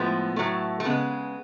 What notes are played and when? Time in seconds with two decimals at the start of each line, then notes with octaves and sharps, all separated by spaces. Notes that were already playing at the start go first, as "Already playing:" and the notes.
Already playing: A2 F3 G#3 B3
0.36 A2 F#3 A3
0.80 A3
0.85 C#3 G#3 B3